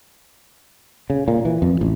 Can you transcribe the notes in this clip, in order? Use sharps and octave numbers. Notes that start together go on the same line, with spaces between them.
C#3
A#2
E3
F2
A1